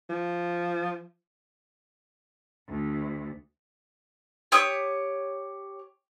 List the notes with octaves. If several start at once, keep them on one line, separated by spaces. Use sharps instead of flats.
F3
D2
G4 C#5 D#6